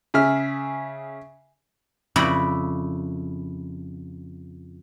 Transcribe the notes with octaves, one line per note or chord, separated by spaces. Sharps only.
C#3 G#4 E5 F6
F2 C#3 E4 D5 B5